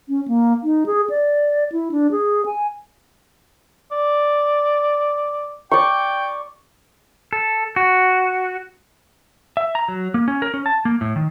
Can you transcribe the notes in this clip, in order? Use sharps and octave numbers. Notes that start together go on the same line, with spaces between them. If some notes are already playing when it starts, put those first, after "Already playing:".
C#4
A#3
D#4
G#4
D5
E4
D4
G#4
G#5
D5
D5 G5 C#6
A4
F#4
E5
A#5
F#3
A#3
C#4
A#4
C#4
A5
A#3
A2
D#3